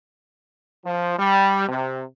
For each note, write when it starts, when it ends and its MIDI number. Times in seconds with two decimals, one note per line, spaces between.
0.86 1.17 53
1.19 1.66 55
1.69 2.03 48